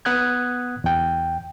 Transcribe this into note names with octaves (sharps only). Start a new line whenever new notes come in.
B3 F#5 D#6 F#6 G#6
E2 G5